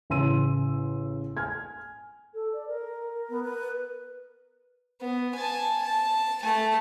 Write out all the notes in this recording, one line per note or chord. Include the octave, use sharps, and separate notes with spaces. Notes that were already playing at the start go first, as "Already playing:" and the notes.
A1 C#3 G#5 C6 E6 D#7
G#5 F6 G#6
A4
D5
A#4
B3
B4
B3
G#5 A5
A5
A3 A5